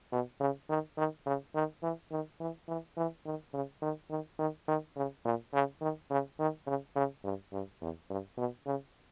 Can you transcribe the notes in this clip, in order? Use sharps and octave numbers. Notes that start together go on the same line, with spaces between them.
B2
C#3
D#3
D#3
C#3
D#3
E3
D#3
E3
E3
E3
D#3
C#3
D#3
D#3
D#3
D#3
C#3
A#2
C#3
D#3
C#3
D#3
C#3
C#3
G2
G2
E2
G2
B2
C#3